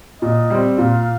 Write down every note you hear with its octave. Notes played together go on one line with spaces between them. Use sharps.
A#2 D#5
G3 C4
A#2 F5